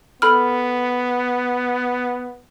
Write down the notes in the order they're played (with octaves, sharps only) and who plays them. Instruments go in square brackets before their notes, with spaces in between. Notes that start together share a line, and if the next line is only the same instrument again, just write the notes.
[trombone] B3 [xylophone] A4 B5 F6